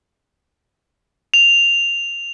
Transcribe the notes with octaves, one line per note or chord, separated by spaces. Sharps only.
F7